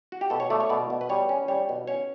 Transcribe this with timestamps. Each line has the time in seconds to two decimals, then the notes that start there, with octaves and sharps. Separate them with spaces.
0.12 F#4
0.21 G4
0.30 B2 A4
0.40 C#5
0.50 A3 D5
0.60 C#5
0.69 B2 D5
0.90 B2
1.01 B4
1.09 G3 C#5
1.29 C#4
1.48 G3 C#5
1.69 B2
1.88 C#4 C#5